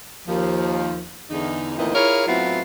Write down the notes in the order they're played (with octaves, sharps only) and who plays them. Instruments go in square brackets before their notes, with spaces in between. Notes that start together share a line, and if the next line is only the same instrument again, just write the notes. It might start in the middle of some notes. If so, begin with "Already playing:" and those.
[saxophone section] D#2 F3
E2 D3 D#4
D2 A#2 D#3 E3 C4 D#5
E4 F4 G#4 A#4 C#5
A2 F#3 B3 C4 E4 F4